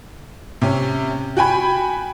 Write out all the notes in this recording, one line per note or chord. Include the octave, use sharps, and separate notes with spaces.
C3 C#4
F#4 G5 G#5 B5